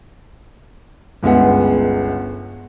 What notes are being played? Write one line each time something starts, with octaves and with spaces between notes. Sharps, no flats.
G1 C#2 G#3 B3 E5 F#5